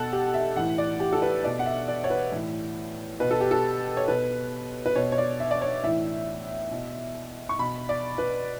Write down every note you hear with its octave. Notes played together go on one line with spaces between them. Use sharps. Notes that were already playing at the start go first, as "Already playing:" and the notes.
Already playing: B2 A4 F#5
G4
E5
A2 E3 F#5
D5
G4
A4
B4
B2 D5
F#5
E5
D5
C#5
B4
A2 E3
B2 B4
A4
G4
A4
C#5
B2 B4
B4
B2 C#5
C#5
D5
E5
D5
C#5
A2 E3 E5
B2
C#6
B2 B5
D5
B4